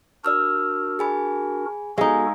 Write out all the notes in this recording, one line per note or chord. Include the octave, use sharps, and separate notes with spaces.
D4 F#4 A#4 D5 E6 F6
G#4 G#5 B5
G#3 B3 D#4 F#4 A4 F5 G#5